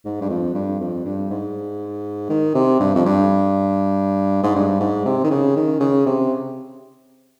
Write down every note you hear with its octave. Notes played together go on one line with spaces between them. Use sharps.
G#2
G2
F2
G2
F2
G2
G#2
D#3
C3
G2
F2
G2
G#2
G2
G#2
C3
D#3
C#3
D#3
C#3
C3